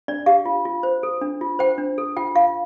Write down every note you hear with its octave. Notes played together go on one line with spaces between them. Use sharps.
D4 D5
G4 F5
F4
F4
C5
A4
D4
F4
C5 G5
D4
A4
F4 G5
F4 F5